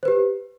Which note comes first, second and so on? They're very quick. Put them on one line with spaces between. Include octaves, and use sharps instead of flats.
C5 B4 G4